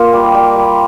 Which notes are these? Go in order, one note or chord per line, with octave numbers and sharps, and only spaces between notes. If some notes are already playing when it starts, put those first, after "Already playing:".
Already playing: A#3 F4
G3
G3
G3